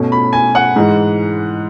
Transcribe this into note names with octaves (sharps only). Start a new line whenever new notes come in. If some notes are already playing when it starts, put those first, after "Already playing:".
Already playing: B2 A3 C#4
B5
G#5
F#5
G#2 E3 G#3